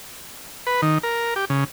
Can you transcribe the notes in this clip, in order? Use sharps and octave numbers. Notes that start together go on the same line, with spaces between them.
B4
D#3
A#4
G4
C#3